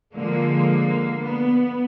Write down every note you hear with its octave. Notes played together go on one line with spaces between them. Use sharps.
D3 F3 G#3 A#3
B3